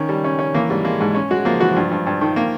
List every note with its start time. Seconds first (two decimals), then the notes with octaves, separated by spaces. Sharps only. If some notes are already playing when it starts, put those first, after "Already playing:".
Already playing: D#3 C#4
0.09 G3
0.24 C#4
0.39 C#4
0.54 E3 A#3
0.70 G#2 G3
0.84 G#3 A#3
1.00 G#2
1.14 C#4
1.31 G#3 F#4
1.45 F3 A#3
1.60 E3 F#4
1.76 G2 F3
1.91 G2
2.07 G2
2.21 D#3
2.36 A#3